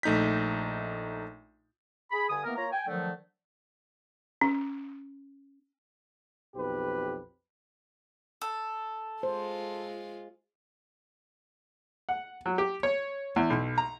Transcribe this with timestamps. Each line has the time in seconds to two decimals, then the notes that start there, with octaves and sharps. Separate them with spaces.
0.03 A#1 A3 D#4 G6 B6
2.12 G#4 B5
2.29 G2 D3 G#5 D#6
2.44 E3 A#3 B3 A#4
2.56 A#3 F4 C#5 A#5
2.72 G5 G#5
2.88 D3 D#3 F3 F#3 A3
4.41 C#4
6.56 B1 F2 G4 B4
8.41 A4
9.23 G#3 F4 C5
12.09 F#5
12.46 F#3
12.58 G4
12.83 C#5
13.36 E2
13.50 B1
13.78 A#5